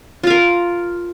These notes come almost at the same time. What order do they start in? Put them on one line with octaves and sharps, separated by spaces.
F4 F5 A#4